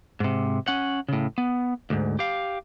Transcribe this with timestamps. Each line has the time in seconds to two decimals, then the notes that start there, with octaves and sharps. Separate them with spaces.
0.20 G#2 C3
0.68 C#4 F#5
1.08 A2 C#3
1.38 B3
1.90 D2 G#2
2.19 G4 F5